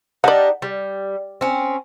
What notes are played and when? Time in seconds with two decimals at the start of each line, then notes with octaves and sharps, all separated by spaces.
0.24 G3 D4 D#4 D5 F#5
0.62 G3
1.41 C4 C#4